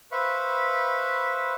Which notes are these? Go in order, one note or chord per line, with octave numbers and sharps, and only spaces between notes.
B4 C5 E5 F5 B5 C#6